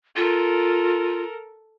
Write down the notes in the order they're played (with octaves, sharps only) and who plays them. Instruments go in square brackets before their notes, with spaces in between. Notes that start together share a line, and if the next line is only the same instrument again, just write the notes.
[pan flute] F4 [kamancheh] A4 A#4